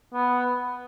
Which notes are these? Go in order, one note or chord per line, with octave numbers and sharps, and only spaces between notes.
B3